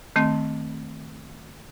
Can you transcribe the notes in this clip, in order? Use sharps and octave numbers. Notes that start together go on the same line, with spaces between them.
D#3 A3 C4